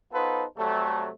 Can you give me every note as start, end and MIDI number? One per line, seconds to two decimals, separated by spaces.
0.13 0.44 59
0.13 0.44 63
0.13 0.44 65
0.13 0.44 69
0.13 0.44 71
0.13 0.44 72
0.58 1.09 48
0.58 1.09 54
0.58 1.09 55
0.58 1.09 57